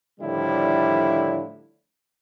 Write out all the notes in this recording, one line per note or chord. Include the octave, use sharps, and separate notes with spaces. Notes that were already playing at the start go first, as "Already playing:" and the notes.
A2 D3 D#3 F3 G3 E4